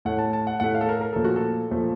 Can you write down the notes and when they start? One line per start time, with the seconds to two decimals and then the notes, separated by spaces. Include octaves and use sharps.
0.05 A2 A3 F#5
0.18 A5
0.33 A5
0.47 F#5
0.60 A2 A3 F#5
0.75 F5
0.81 A4
0.89 A#4
1.01 A#4
1.13 A#2 F3 A3 A4
1.24 F#4
1.36 A4
1.71 A#2 F3 A3